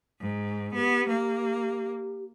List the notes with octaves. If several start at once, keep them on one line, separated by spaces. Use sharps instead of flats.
G#2
B3 G4
A#3